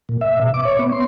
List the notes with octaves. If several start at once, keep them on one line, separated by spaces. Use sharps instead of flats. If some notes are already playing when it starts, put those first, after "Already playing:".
A#2
E5
B2
D6
C#5
B3
C6